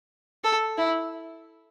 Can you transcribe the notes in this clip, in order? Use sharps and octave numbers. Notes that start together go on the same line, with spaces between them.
A4
E4